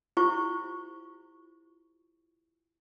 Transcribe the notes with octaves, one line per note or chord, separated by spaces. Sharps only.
E4 F4 G4 C5 C#6